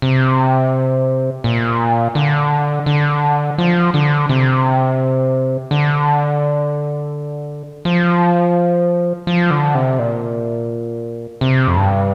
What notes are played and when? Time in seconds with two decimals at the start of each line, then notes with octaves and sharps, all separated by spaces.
0.02 C3
1.44 A#2
2.15 D3
2.86 D3
3.58 F3
3.94 D3
4.29 C3
5.71 D3
7.85 F3
9.27 F3
9.51 D3
9.75 C3
9.99 A#2
11.41 C3
11.68 F2
11.76 G2